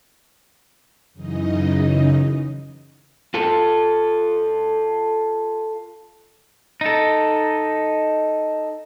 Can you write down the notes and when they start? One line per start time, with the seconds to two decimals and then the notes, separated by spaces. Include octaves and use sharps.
1.13 F#2 C#3 E3 D#4 D#5
3.34 F4 A4
6.81 D#4 A4